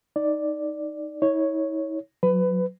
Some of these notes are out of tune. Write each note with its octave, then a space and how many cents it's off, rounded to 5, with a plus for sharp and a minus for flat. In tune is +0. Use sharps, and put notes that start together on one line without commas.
D#4 +0 D5 +0
E4 -45 C#5 +0
F#3 -15 B4 +20